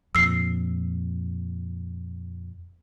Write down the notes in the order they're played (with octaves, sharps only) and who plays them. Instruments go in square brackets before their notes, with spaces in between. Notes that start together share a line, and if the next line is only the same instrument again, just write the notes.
[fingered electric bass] F2 A#2 [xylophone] E6 C7